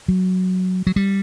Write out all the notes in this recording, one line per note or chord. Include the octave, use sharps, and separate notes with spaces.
F#3
F#3
G3